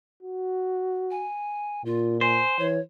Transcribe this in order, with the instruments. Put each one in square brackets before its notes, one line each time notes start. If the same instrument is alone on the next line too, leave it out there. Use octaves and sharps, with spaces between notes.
[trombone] F#4
[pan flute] G#5
[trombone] A#2 [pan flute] F4
[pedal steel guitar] C5 [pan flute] G#5
[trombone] E3 [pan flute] C#5